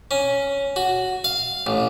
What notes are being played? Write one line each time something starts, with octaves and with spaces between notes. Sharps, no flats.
C#4
F#4
F5
A1